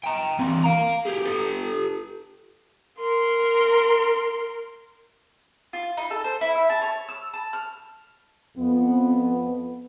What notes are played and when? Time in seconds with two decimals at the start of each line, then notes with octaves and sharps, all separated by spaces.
0.04 G5 A#5
0.39 E3 C4
0.64 F5 A#5
1.05 G4 G#4
1.22 G4 A4
3.00 A#4 C6
5.73 F4
5.97 D#4
6.11 A4
6.24 C5
6.41 E4
6.55 E5
6.70 A5
6.81 C#5
7.09 E6
7.34 A5
7.53 F6
8.57 F2 B3